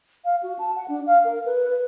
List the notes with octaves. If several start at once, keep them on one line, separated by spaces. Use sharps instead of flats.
F5
F#4
A5
F#5
D4
F5
A#4
B4
B4